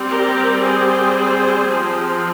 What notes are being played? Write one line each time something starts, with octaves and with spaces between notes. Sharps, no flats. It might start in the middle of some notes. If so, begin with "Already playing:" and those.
Already playing: G3 C4
G4 A#4
G#4 C5
F3 C4